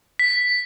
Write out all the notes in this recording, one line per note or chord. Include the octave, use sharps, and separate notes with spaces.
B6